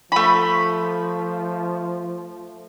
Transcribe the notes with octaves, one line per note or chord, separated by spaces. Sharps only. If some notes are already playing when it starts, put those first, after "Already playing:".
F3 A3 B5